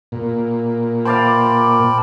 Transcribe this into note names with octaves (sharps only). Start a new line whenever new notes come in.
A#2
C5 D5 F5 G5 A5 B5